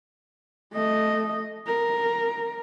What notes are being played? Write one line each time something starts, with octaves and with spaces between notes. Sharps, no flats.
A3 D#5
A#4